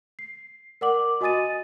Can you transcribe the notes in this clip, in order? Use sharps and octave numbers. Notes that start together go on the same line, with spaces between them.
C7
A#4 D5 F#5 D6 F#7
F#4 D#5 G#5 D#6 A6 D#7